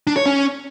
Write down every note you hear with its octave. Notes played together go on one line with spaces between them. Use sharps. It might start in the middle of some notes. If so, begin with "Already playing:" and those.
D4
C#5
C#4